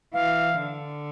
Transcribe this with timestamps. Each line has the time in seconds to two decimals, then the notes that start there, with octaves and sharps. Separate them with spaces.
0.13 E3 F5
0.61 D3